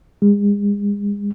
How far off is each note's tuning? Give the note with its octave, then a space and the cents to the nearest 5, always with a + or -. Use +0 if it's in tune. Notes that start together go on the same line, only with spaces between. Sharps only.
G#3 -35